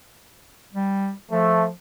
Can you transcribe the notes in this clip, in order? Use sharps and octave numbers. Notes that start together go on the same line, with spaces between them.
G3
F3 A3